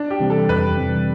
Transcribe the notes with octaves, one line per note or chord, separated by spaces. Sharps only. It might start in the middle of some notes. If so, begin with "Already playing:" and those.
Already playing: D4
G4
C3 E3 G3 C4
A4
F2 B4
C3 E3 G3 C4